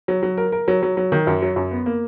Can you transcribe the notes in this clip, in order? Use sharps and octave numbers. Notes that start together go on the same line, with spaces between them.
F#3
F#3
A#4
A#4
F#3
F#3
F#3
D#3
F#2
F#3
F#2
B3
A#3